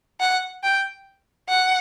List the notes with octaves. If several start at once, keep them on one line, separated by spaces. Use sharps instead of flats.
F#5
G5
F#5